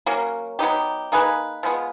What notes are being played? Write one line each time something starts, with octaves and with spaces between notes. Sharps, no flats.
F#3 A#3 C#4
F#3 B3 D#4 G4
A#3 D#4 G#4 B4
F3 G#3 B3